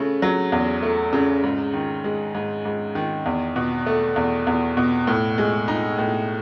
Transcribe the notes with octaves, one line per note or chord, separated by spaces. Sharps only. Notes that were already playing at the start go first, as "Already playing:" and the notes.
Already playing: C#3 A3
F#3
E2
A3
C#3
G#2
D#3
G#3
G#2
G#2
D#3
E2
B2
A3
E2
E2
B2
A2
G#3
D#4
A2